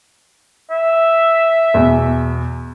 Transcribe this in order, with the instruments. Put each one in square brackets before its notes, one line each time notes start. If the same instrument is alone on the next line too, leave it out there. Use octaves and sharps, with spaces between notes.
[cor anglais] E5
[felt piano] E2 B2